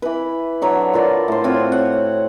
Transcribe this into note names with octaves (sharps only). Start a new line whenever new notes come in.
E3 B4
D3 F#3 C#5 E5
F4 A4 A#4 D5
A2 C5
C4 F4 F#4 C#5
F#5